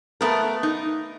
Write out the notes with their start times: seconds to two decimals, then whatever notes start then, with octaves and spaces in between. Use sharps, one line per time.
0.21 A3 B3 A#4
0.63 D#4